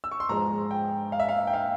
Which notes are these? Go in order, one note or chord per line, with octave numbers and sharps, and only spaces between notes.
E6
C#6
C6
G#2 F3 G#3 A#5
G5
F5
E5
F5
G5
F5